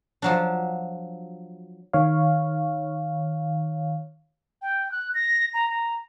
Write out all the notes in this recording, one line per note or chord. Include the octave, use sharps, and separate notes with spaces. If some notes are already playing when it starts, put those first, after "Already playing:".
F3 F#3 D4
D#3 C#5 F5
G5
F#6
A#6
A#5
A#5